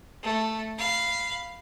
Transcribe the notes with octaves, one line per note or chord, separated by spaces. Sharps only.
A3
F5 B5